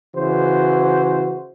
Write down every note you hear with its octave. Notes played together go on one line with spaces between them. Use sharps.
C#3 E3 F#4 C5